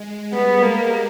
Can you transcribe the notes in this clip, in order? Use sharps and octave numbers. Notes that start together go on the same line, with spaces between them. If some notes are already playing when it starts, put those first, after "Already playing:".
Already playing: G#3
G3 B3
A#3